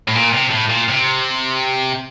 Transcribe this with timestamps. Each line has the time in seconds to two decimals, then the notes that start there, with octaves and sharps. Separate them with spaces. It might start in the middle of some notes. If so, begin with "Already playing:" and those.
0.08 A2
0.15 A#2
0.33 C3
0.51 A2
0.70 A#2
0.88 C3